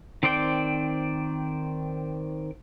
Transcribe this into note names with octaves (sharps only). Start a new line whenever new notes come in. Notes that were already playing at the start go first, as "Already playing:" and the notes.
D#3 C4 C5 D5 G5